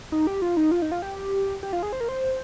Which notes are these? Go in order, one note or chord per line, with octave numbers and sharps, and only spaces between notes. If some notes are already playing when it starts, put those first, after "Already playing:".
D#4
G4
F4
D#4
F4
D#4
F4
G4
G4
F4
G#4
C5
A#4
C5